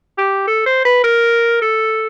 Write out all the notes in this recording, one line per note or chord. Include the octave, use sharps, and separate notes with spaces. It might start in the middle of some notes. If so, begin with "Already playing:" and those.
G4
A4
C5
B4
A#4
A4